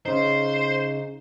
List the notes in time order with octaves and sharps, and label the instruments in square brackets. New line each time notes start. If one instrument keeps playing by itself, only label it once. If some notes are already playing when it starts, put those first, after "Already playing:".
[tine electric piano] C#3 D#4 [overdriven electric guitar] C5